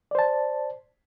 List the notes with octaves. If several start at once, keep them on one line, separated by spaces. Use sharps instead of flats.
C5 D5 A5